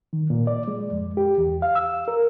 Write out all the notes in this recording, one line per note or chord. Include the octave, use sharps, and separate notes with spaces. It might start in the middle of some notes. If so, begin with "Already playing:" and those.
D#3
A#2
D5
G#3
F2
G4
E2
F5
E6
A#4